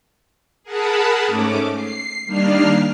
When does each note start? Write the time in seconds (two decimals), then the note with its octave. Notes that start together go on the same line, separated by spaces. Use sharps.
0.63 G#4 A#4 F#5 A5 B5
1.27 G#2 A3 C#4 D6
1.74 C7
2.26 D#3 G3 A#3 D4 F6 C7